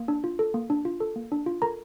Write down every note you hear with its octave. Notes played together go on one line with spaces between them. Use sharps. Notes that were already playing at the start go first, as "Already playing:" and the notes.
Already playing: A#3
D4
F4
A4
A#3
D4
F4
A4
A#3
D4
F4
A4 A#4 A#5